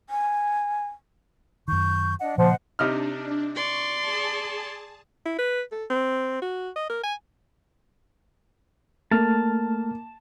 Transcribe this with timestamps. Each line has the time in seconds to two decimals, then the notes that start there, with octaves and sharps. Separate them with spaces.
0.10 G#5
1.68 F#2 D#3 C#6 G6
2.20 D4 D#5 F#5
2.38 A#2 C#3 F3 A#3 C5 D#5 F#5
2.79 C3 D4 D#4 F6
3.55 D5 C6 C#6
4.00 G#4 A5
5.26 E4
5.39 B4
5.72 A4
5.90 C4
6.42 F#4
6.76 D#5
6.89 A#4
7.03 G#5
9.11 A3 A#3 A5 F6